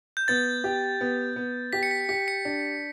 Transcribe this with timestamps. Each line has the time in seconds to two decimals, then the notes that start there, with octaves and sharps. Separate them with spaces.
0.17 G6
0.28 B3 A6
0.64 G4
1.01 B3
1.36 B3
1.73 G4 B6
1.83 C#7
1.91 B6
2.09 G4 B6
2.28 C#7
2.45 D4